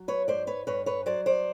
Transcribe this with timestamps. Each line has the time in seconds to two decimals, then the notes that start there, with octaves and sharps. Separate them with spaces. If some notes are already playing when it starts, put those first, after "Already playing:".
Already playing: F#3
0.08 B4 C#5
0.28 G#2 C5 D5
0.47 B4 C#5
0.67 G2 B4 C#5
0.86 B4 C#5
1.06 F#3 C5 D5
1.26 C5 D5